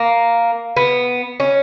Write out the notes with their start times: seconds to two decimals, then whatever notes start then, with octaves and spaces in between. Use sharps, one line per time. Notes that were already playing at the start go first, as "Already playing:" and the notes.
Already playing: A#3
0.77 B3
1.40 C#4